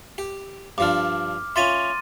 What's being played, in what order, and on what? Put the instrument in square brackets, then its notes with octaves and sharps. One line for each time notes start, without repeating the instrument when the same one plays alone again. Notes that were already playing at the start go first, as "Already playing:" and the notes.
[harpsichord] G4
[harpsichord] G2 F3 D4 [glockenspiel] D6 F6
[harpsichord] C#4 F4 E5 [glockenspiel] C6 A6 D#7